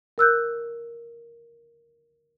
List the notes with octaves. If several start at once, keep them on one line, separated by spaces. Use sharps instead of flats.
A#4 E6 F#6 G6